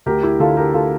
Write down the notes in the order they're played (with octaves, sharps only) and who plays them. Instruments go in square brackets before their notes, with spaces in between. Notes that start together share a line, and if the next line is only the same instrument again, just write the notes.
[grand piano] D2 G4 A#4
E4 G4
D3 F4 A4
G4 A#4
F4 A4